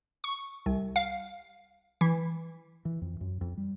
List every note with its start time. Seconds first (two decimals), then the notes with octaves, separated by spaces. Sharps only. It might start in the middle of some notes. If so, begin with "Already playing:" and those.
0.24 C#6
0.66 C2
0.96 F5
2.01 E3
2.85 E3
3.02 F2
3.21 F#2
3.41 F2
3.57 G3